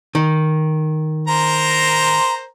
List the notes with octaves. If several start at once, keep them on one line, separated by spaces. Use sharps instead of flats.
D#3
A#4 C5 A#5